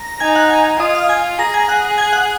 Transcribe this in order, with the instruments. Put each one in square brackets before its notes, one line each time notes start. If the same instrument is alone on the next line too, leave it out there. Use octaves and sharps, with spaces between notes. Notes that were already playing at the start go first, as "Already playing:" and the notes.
Already playing: [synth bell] A#5 A#6
[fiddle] D#4 [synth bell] G#5 G#6
[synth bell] F#5 F#6
G#5 G#6
[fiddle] F4 [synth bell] D#5 D#6
[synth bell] F5 F6
[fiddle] F4 [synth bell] G#5 G#6
[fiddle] G#4 [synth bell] A#5 A#6
[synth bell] G#5 G#6
F#5 F#6
G#5 G#6
F#5 F#6